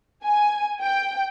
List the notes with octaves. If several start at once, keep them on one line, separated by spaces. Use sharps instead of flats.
G#5
G5